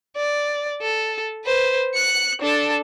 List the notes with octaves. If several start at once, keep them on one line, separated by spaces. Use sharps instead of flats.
D5
A4
B4 C5
F#6 C#7
D4 A4